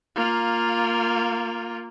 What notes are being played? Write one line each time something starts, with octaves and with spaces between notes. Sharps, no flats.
A#3 F4